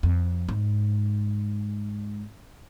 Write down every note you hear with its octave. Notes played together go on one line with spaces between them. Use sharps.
F2
G#2